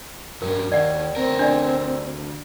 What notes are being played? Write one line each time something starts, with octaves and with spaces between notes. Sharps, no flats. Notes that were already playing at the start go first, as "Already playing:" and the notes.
G2 F#3 A#4
D#2 D5 F#5
D2 C4 A#4
D4 D5